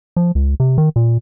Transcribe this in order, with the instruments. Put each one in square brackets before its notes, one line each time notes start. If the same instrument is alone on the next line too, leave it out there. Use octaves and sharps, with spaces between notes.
[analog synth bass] F3
C#2
C3
D#3
A#2